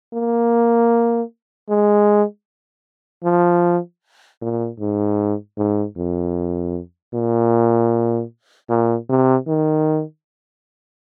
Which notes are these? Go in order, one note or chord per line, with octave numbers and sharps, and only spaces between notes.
A#3
G#3
F3
A#2
G#2
G#2
F2
A#2
A#2
C3
D#3